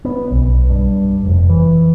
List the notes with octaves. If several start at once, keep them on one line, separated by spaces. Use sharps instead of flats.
B3
B1
G2
F1
E3